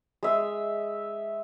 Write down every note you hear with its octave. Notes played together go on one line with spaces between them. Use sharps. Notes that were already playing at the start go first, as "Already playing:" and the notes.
G#3 E5